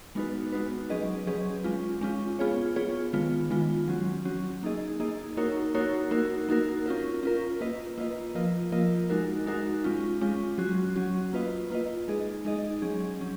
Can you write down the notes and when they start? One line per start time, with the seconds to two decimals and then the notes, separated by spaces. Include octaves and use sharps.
0.15 G#3 B3 D#4 F#4 B4
0.52 G#3 B3 D#4 F#4 B4
0.90 F#3 C#4 G#4 B4 D#5
1.27 F#3 C#4 G#4 B4 D#5
1.64 G#3 C#4 F4
2.01 G#3 C#4 F4
2.39 B3 F4 G#4 C#5
2.76 B3 F4 G#4 C#5
3.13 D#3 G#3 B3 F4
3.50 D#3 G#3 B3 F4
3.88 F#3 C#4 F#4
4.25 F#3 C#4 F#4
4.63 A#3 D#4 G#4 D#5
5.00 A#3 D#4 G#4 D#5
5.37 A#3 D#4 F#4 A#4 C#5
5.74 A#3 D#4 F#4 A#4 C#5
6.11 A#3 D#4 F#4 A#4
6.49 A#3 D#4 F#4 A#4
6.86 C#4 F4 A#4
7.23 C#4 F4 A#4
7.60 A#3 F4 B4 D#5
7.98 A#3 F4 B4 D#5
8.35 F3 A#3 F4 A#4 D#5
8.72 F3 A#3 F4 A#4 D#5
9.10 G#3 D#4 F#4 A#4
9.46 G#3 D#4 F#4 A#4
9.84 G#3 C#4 F4
10.21 G#3 C#4 F4
10.58 F#3 C#4 F#4
10.96 F#3 C#4 F#4
11.33 A#3 F4 B4 D#5
11.70 A#3 F4 B4 D#5
12.08 G#3 D#4 G#4 D#5
12.45 G#3 D#4 G#4 D#5
12.82 F#3 C#4 G#4
13.20 F#3 C#4